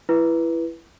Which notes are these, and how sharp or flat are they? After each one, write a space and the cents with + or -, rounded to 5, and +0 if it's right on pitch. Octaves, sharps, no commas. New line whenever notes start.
E4 +20 B4 -10